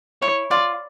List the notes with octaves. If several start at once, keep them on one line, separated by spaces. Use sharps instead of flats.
E4 C#5
F4 D5